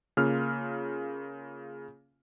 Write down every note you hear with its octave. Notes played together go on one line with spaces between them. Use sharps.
C#3 A#3 F4 F6